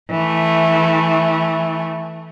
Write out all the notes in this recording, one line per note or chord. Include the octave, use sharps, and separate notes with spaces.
E3 A3